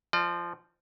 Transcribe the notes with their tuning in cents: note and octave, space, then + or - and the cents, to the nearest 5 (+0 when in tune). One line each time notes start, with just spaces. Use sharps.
F3 -15 D5 +45